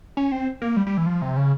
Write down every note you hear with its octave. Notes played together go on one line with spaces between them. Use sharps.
C#4
C4
A#3
G3
G3
E3
F3
C3
C#3